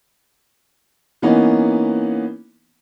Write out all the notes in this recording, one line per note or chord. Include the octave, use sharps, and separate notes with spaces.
E3 A#3 B3 C#4 D#4